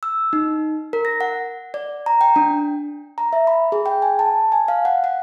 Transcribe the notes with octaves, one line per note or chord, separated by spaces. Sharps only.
E6
D#4
A#4
A#6
F#5
D5
A#5
G5
D4
A#5
E5
B5
G#4
G5
G#5
A5
G#5
F5
F#5
F#5